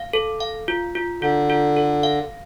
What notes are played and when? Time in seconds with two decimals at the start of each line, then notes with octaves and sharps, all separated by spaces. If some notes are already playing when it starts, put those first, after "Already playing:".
Already playing: F5
0.13 A4
0.40 F5
0.68 F4
0.95 F4
1.22 D3 F4
1.50 F4
1.77 A4
2.03 F5